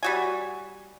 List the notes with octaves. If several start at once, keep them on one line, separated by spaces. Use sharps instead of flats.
G3 F#4 G#5